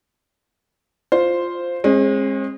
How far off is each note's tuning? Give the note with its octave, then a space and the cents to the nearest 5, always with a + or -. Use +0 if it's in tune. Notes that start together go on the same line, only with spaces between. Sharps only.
F4 +0 C5 +0
G#3 -10 C4 +45